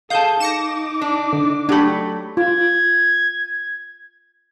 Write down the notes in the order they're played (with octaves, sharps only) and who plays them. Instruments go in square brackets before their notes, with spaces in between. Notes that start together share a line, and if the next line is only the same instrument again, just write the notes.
[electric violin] G#4 A4 [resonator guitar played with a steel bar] F5 A5 [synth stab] D#6 G6
[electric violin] D#4 D6 [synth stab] A#6 C#7 E7
[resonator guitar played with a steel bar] D4
[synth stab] D3
[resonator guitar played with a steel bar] F#3 A3 [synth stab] D4 G4 B5
[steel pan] F4 [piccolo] G#6